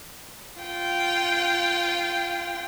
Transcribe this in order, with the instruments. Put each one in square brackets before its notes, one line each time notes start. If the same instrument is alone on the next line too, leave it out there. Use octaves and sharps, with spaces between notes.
[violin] F4 G5